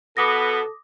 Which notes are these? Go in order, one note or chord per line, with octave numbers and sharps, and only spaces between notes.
B2 B3 A4 D6 D#6 A#6